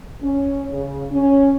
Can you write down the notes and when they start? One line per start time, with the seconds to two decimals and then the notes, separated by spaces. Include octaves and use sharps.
0.22 C#4
0.71 C#3
1.11 C#4